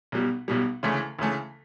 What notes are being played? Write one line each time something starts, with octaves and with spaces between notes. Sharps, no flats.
B1 B2 G3
B1 B2 G3
D2 C#3 E3 A3
D2 C#3 E3 A3